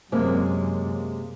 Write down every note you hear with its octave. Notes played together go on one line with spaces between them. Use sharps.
F#2 C3 G#3 A#3